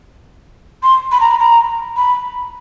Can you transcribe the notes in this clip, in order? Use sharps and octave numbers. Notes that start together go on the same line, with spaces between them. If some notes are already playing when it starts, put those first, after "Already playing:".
C6
B5
A#5
B5
A#5
B5